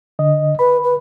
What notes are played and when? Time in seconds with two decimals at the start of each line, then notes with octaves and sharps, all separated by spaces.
0.19 D3 D#5
0.59 B4 B5
0.83 B4